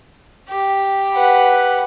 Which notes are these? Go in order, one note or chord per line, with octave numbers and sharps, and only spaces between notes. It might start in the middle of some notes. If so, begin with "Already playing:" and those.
G4
B4 F#5